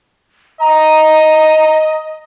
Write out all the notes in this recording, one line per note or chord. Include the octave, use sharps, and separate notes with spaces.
D#5 A#5